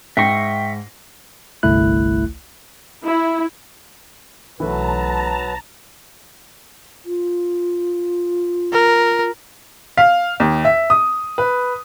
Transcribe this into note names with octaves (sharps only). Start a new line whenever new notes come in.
G#2 E5 G5 C#6 A#6 C7
G1 C2 A3 E4 F#6
E4
B1 E3 F#3 A3 B4 A5 A#5
F4
A#4
F5
D#2
E5
D#6
B4